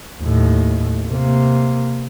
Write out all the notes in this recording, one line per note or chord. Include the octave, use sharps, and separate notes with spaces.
D#2 A2
C3 A#3